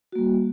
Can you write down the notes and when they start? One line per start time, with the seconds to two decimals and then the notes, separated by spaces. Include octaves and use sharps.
0.12 F#4
0.15 A#3
0.18 G3